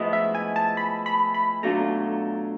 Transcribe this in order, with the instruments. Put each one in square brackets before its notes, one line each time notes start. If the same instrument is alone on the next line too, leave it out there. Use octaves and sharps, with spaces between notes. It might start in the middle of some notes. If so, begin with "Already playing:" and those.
Already playing: [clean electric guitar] A2 F3 G#3 B3 E4 [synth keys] D#5
[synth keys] E5
G#5
A5
B5
B5
B5
[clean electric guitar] B2 F#3 A3 D4 F4 [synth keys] A#5